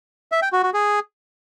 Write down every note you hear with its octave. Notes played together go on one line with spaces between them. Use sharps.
E5
G5
F#4
F#4
G#4